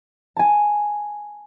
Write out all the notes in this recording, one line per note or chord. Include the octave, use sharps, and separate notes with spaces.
G#5 A5